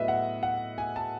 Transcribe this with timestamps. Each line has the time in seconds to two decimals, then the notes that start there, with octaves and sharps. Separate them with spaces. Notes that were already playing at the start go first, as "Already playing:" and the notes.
Already playing: A2 F#3 B3 B4 D#5 E5
0.08 F#5
0.43 F#5
0.78 G#5
0.96 A5